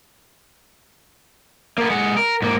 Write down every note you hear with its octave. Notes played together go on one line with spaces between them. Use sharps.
A#3 B3
G#3 F#5
A#4
G#2 A#3